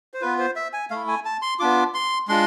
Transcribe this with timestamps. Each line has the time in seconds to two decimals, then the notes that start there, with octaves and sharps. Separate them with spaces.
0.14 C5
0.21 B3 F4 B4
0.39 C5
0.56 E5
0.73 G#5
0.90 A3 E4 F5
1.08 G#5
1.25 A5
1.42 C6
1.59 B3 D4 F4 D6
1.94 C6
2.28 G#3 D4 F4 C6